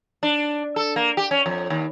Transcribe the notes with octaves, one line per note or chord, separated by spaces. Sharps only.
D4
A4
A#3
G4
C#4
F2
D#2